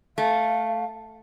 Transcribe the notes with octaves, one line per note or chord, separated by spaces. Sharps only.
A3 F5